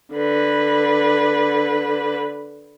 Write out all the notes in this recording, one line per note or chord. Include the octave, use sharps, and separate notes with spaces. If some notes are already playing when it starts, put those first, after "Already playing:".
D3 B4